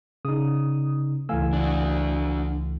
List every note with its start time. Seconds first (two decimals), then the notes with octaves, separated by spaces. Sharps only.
0.25 C#3 D#4 D#6
1.29 C#2 E3 A3 F5 G#5 E6
1.53 D4 F#4